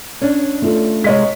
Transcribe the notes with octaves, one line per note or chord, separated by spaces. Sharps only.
C#4 D4
A3 F4 A4
C3 G#3 C#5 D#5 B6